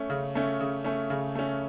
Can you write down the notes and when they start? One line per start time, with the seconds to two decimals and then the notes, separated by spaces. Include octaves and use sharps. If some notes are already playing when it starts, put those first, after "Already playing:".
Already playing: A3 C#4
0.10 C#3
0.35 A3 C#4
0.60 C#3
0.84 A3 C#4
1.10 C#3
1.35 A3 C#4